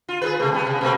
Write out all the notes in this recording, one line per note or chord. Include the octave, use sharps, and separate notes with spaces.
F4
G#4 A4 B4
C3 A3
G3 B3
C3
B2 A3 A#3